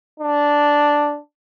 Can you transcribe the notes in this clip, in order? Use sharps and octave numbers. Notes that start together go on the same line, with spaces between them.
D4